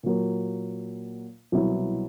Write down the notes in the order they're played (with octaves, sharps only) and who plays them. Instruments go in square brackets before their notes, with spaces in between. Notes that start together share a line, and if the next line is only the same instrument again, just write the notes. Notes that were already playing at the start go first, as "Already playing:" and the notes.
[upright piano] A#2 F#3 A#3
C2 B2 F#3 B3 E4